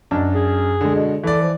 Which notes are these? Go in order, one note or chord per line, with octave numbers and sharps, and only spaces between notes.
F#2 B2 D4
G#4
D3 G#3
B2
E3 A4 D5
F3